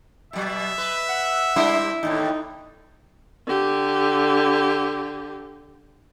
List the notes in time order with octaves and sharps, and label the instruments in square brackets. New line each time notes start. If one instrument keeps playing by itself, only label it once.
[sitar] B2 F#3 [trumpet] E5
[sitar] B4
[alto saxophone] F#5
[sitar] G3 D4 C5 [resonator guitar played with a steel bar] E4
[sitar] D#2 A2 D3 [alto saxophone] D#4
[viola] D3 G4